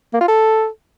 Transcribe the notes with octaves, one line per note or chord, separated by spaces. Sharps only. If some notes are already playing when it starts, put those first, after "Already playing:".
A#3
F4
A4